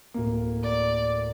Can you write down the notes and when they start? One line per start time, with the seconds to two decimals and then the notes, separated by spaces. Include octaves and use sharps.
0.14 D1 A#3
0.63 D5